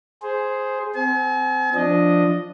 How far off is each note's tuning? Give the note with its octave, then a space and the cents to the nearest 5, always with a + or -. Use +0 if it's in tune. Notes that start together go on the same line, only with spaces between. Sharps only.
G#4 +5 C5 +0
C4 -25 G#5 +45
F3 +0 D4 +0 D#5 +0